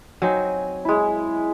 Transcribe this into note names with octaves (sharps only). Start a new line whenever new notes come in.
F#3 C4 D#4 G#5
G#3 E4